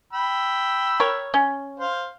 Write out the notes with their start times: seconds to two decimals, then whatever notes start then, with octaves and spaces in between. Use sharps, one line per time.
0.13 G5 B5 E6
1.00 A#4 C#5
1.34 C#4
1.80 C5 F5